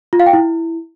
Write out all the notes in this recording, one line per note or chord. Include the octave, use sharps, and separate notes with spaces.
F4
F5
G5
E4